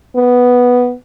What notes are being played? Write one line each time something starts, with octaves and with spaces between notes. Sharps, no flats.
B3